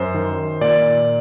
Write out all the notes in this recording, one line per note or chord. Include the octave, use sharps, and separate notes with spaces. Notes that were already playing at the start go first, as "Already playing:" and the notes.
Already playing: F#2 C5
D#3
A#2 D5